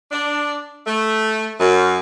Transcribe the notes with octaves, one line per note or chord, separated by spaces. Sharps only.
D4
A3
F#2